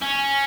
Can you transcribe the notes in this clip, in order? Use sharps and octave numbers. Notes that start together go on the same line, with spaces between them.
C#4